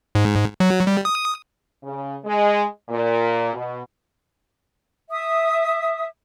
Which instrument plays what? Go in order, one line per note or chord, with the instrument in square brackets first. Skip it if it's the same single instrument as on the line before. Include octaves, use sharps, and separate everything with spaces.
[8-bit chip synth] G#2
F#3
G3
D#6
[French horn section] C#3
G#3
A#2
B2
[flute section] E5 D#6